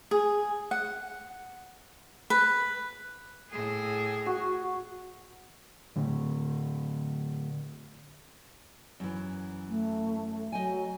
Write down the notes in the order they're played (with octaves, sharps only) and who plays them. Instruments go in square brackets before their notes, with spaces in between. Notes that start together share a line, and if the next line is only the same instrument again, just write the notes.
[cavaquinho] G#4
F#5
B4
[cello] A2 G#4
[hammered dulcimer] F#4
[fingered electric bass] A2 D3 A3
[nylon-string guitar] F#2 E3
[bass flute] A3
[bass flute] F#3 [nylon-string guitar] D#5 G5 G#5